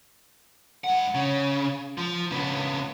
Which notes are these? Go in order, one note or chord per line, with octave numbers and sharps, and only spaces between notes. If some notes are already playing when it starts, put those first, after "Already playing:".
G2 F#5
C#3
F3
C#3 B3